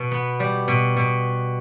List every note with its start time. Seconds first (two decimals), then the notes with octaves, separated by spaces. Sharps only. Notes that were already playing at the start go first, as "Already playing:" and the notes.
Already playing: B2
0.11 B3
0.40 G3
0.68 B2
0.96 B2